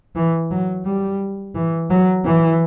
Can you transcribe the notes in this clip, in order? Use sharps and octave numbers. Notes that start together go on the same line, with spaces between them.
E3
F#3
G3
E3
F#3
E3